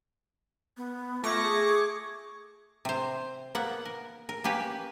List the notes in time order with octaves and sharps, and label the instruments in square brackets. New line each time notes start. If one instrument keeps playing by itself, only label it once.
[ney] B3
[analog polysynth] A3 A#6 C#7 [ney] F4 [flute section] C#6 D6 G#6
[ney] G#4
[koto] C3 C5
A#3 B3 F#5
A#4
A#4
A#3 C#4 G4 B4